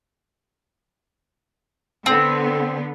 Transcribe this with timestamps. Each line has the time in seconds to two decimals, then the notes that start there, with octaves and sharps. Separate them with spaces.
2.06 D3 B3 C4